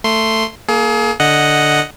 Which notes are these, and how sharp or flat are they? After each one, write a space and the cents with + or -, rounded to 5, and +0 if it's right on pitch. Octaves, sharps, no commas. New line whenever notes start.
A3 +15 C6 +0
A#3 +0 G#4 +35
D3 +0 D#5 +0 F#5 +0